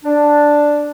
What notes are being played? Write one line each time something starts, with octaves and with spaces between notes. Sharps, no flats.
D4